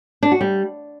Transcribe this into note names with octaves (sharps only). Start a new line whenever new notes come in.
D4
F#4
G3